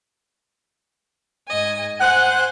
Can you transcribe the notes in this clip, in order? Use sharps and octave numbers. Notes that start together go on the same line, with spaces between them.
G#2 D#5 G#5
C5 F#5 G#5 F#6